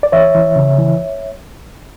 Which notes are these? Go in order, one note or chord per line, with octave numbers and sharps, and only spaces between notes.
D5
E3 C#5 E5
E3
C#3
E3